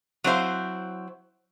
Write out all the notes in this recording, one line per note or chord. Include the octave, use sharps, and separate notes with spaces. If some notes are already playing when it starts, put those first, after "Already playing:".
F#3 C4 E4 C5 F5